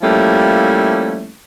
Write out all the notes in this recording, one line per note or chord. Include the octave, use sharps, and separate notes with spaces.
F3 G3 A3 A#3 C#4 E4